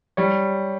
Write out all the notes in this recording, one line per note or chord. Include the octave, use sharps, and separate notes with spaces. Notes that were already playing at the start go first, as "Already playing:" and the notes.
G3 C#5